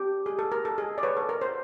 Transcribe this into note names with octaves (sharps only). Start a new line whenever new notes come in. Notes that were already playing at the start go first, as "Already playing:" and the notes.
Already playing: G4
G#4
A4
A#4
A4
G#4
D5
B4 C#5
A4
A#4
C5